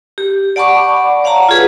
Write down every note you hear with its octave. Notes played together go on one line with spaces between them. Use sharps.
G4
D5 F#5 A5 B5 C#6 D6
C#5 F5 F#5 A5 A#5
F4 G#4 B4